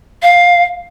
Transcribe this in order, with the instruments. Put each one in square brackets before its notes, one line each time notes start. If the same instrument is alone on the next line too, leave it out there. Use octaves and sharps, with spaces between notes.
[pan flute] F5